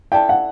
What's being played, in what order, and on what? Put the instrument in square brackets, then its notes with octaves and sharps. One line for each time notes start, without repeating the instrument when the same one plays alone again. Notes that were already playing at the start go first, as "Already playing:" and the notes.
[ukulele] E4 A4 D5 A5 [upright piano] G5
[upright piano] F#5